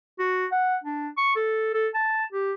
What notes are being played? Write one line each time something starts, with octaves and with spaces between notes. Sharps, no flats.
F#4
F#5
D4
C#6
A4
A4
A5
G4